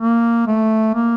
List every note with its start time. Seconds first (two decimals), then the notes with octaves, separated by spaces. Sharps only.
0.01 A#3
0.47 A3
0.95 A#3